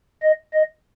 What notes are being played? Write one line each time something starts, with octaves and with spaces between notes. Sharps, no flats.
D#5
D#5